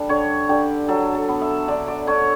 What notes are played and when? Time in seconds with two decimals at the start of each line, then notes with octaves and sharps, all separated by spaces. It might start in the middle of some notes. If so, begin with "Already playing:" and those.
Already playing: G3 D4 A4
0.09 D3 C#5
0.49 D3 G4
0.88 F#3 A4
1.15 A4
1.29 B3
1.42 E5
1.68 D3 D5
1.88 D5
2.07 D3 C#5